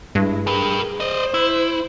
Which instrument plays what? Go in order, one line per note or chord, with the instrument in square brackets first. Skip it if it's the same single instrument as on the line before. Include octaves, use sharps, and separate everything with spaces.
[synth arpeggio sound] G2 [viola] G#3 E4
[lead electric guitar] G4 B4 [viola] G#4 A#4
[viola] C5 [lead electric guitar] D5 D#5
[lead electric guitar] E4